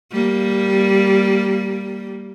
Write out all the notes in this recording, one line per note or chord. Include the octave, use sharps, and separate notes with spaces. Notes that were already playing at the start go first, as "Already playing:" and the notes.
G3 A#3